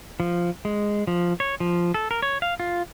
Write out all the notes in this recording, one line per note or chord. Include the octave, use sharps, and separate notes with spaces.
F3
G#3
F3
C#5
F3
A4
A#4
C#5
F5
F4